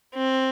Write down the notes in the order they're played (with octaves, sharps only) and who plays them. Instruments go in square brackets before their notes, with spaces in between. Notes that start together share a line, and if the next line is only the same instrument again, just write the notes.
[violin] C4